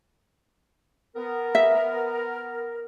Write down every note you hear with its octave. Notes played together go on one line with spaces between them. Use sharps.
B3 A#4
E5